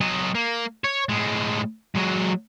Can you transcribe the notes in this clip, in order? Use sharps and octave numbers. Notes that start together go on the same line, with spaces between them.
F#3 D#5
A#3
C#5
A2 G#3
F#3 G#3